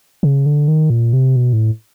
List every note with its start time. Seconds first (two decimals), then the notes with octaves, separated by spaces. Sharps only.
0.23 C#3
0.46 D3
0.68 D#3
0.90 A#2
1.13 C3
1.36 B2
1.53 A2